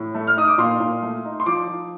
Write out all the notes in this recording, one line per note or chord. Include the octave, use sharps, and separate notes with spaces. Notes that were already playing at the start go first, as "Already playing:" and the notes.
Already playing: A2
A3
F6
D#4 D#6
D6
A#2 C6
A#2
A3
D#4
C6
F3 D6
F3